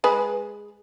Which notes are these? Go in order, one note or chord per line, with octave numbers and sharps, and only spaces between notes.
G#3 G#4 B4